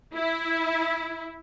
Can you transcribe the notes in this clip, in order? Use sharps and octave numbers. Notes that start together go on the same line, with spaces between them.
E4